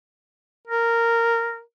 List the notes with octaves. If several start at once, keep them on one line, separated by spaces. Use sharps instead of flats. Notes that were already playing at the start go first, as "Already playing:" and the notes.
A#4